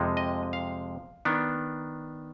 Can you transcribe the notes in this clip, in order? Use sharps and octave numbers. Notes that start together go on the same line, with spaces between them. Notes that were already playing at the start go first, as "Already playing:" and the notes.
Already playing: F2 C3 F3 G#3
D#5
F5
D#3 B3 D4